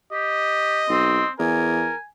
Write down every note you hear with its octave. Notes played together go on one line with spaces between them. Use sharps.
G4 D#5
B1 C4
E2 A#4 G#5